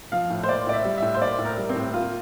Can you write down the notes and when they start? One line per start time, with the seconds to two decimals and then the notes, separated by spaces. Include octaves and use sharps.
0.12 F3 F5
0.30 A2
0.43 C5
0.49 A#3 D5
0.67 A2 D5
0.73 E5
0.85 G3
0.98 A2 E5
1.14 C5
1.21 A#3 D5
1.39 A2
1.45 A#4
1.58 G3
1.70 C4
1.76 A2
1.93 A#3 F4